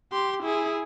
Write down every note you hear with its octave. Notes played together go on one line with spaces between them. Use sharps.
G4 C6
E4 G#4